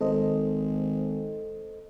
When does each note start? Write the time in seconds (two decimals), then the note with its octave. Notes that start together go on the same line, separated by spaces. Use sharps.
0.01 G#1 A4 C5 D#5